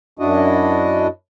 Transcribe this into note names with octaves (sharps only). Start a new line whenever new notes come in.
F#2 D4 E4 F#4 D#5